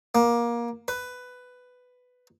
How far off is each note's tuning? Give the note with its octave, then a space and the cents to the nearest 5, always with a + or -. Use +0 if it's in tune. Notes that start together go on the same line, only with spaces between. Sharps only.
A#3 +20
B4 +10